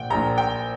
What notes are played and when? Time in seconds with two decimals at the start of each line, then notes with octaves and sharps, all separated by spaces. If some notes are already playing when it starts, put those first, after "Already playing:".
Already playing: A#1 A#2 F#5 G5
0.10 A#1 A#2 A#5
0.38 G5